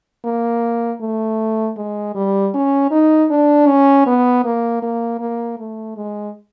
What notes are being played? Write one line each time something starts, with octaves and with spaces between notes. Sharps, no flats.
A#3
A3
G#3
G3
C#4
D#4
D4
C#4
B3
A#3
A#3
A#3
A3
G#3